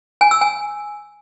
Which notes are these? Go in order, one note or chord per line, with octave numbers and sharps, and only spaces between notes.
G#5
E6
G#5